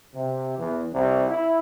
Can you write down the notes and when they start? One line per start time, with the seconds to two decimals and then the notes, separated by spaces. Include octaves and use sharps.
0.13 C3
0.58 E2
0.93 C2
1.27 E4